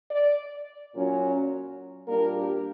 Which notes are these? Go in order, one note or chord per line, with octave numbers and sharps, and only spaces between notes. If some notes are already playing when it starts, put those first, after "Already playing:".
D5
A#2 F#3 C#4
A#2 G3 A#3 D4 A#4
G4